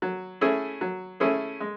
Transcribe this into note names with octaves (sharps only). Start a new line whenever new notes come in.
F#3
A3 C#4 E4 G#4
F#3
A3 C#4 E4 G#4
G#3